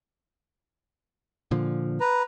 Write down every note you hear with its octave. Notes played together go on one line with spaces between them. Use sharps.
A#2 D3 F3
B4 A#5